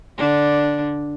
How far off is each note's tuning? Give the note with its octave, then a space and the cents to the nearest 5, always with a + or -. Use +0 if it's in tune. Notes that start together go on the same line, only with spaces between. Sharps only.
D3 -5 D4 +0